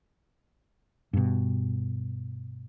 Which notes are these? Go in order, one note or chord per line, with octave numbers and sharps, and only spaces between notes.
G2 B2